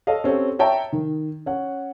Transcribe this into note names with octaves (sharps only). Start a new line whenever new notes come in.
A4 C#5 D#5 F5
C4 C#4 G4 A4
C#5 E5 G5 A5 A#5
D#3
C#4 F#5